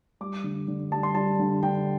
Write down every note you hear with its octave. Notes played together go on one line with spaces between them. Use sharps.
G3 D6
D3
D3
G3 A5
C6
G3 A5
D3
D3 G5